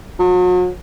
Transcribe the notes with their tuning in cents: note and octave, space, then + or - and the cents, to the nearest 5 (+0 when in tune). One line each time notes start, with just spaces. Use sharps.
F#3 -40